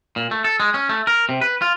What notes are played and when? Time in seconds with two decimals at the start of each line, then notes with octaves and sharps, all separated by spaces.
0.16 A#2
0.31 A3
0.44 A4
0.60 G#3
0.74 C#4
0.89 A3
1.07 A#4
1.29 C3
1.41 B4
1.62 F4